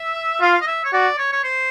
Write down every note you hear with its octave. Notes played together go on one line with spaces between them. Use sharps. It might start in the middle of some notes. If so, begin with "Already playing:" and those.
Already playing: E5
F4 F5
F5
D#5
E5
C#5
F#4 D5
C#5
C#5
C5